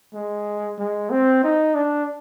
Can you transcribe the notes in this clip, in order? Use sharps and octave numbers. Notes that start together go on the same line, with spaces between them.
G#3
G#3
C4
D#4
D4